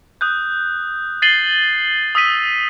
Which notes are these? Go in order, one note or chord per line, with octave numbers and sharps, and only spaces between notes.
D#6 F#6 G6
A6 C7 D#7 F#7 G7
D#6 E6 B6 D#7